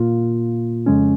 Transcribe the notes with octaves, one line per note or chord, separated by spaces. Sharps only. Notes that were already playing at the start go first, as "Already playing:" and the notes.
Already playing: A#2 A#3 F4
F2 C#3 G#3 C#4